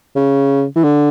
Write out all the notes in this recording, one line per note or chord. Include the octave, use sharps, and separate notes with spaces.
C#3
E3
D3